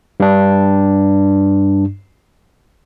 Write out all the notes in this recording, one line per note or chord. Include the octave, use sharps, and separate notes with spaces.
G2 D4